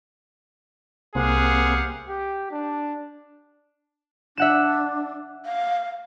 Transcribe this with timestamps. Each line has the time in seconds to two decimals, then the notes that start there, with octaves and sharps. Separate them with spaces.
1.15 C2 A#3 C4 G4 G#4 F5 F#5
2.07 G4
2.51 D4
4.37 D4 E5 F#5 E7
5.46 F5